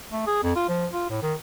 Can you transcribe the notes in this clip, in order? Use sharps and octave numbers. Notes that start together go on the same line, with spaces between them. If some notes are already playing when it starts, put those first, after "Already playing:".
A3
G#4
F2
F4
F3
F4
A2
D#3